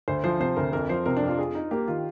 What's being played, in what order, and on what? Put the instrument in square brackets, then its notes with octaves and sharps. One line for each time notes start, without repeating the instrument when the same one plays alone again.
[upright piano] D2 [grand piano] C5
[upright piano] F3 [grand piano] C5
[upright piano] C3 [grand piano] C5
[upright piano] D2 [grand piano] A#4
[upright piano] F2 [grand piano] A#4
[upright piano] F3 [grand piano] C5
[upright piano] C3 [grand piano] A#4
[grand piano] D4
[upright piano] F2
[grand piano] F4
[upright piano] G#4
D#4
[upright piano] A#3 [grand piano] G4
[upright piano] D#3 [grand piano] F4